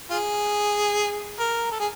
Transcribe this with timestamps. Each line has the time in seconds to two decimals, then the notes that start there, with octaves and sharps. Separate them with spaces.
0.10 F4 G#4
1.40 A#4
1.72 A4
1.80 G#4